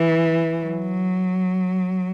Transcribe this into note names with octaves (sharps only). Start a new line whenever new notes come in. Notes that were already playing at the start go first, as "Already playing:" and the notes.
Already playing: E3
F#3